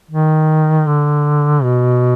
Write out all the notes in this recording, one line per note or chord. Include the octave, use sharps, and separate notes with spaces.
D#3
D3
B2